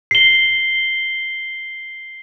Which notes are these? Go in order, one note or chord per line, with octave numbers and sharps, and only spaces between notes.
C7 G7